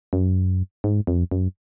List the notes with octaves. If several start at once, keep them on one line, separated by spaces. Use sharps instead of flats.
F#2
G#2
F2
F#2